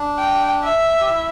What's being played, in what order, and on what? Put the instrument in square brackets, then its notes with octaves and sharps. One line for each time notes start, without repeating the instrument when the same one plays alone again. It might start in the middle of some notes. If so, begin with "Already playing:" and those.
Already playing: [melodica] D4
[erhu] G5
E5
[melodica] G4
E4